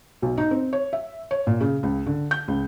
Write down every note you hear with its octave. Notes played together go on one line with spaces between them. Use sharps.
B1
D#4
C4
C#5
E5
C#5
A#2
C#3
C#2
D3
G6
C#2